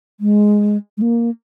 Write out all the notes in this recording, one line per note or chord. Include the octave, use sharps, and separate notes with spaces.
G#3
G#3
A#3